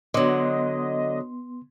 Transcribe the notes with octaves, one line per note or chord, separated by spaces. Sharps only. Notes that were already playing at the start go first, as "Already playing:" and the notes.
D3 F#3 B3 D#5 C6